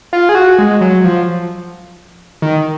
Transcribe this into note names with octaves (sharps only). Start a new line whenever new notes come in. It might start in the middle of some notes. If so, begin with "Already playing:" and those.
F4
G#4
F#4
G#3
F#3
F3
D#3